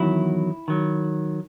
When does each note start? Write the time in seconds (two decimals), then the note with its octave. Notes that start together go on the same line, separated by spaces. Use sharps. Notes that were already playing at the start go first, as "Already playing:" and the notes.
Already playing: E2 D#3 F#3 E4
0.68 D#3 F#3